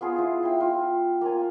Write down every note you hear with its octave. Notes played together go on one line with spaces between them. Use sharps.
B3 F4 G#4
E4 F4
E4 G5
F4
A#3 F4 G#5